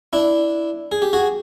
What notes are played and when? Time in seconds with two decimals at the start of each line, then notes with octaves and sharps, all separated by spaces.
0.13 D4 E4
0.92 G#4
1.02 G4
1.13 F#4 G#4